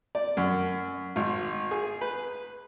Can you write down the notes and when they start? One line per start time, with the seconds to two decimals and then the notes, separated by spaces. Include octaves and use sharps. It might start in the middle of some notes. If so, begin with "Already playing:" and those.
0.15 D5
0.37 F#2
1.16 G#1
1.71 G#4
2.01 B4